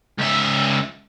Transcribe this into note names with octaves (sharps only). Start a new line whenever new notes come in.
C#2 E5